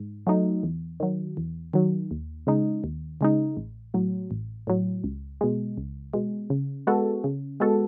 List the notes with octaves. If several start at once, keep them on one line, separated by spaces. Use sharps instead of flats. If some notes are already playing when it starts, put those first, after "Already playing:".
Already playing: G#2
F#3 A3 D#4
E2
D#3 F#3
E2
D#3 F#3
D#2
C#3 G#3 D#4
D#2
C#3 G#3 D#4
A1
A2 F#3
A1
A2 F#3
C#2
B2 G#3
C#2
B2 G#3
C#3
G#3 B3 F#4 A4
C#3
G#3 B3 F#4 A4